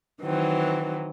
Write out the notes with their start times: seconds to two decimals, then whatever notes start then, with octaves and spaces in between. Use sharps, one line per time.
0.21 D#3 E3 F#3 C4